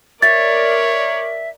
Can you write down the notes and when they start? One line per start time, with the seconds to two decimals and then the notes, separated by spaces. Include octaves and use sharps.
0.22 A#4 C#5 D5 E5 A6